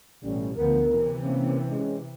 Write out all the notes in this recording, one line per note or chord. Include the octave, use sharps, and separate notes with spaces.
A1 B2 G3 A3 C#4
D2 F3 B3 A#4
C3 E3
A#3 C4 C#4
G#3 C#4